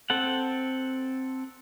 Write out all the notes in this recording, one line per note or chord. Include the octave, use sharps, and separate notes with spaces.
C4 A4 F#5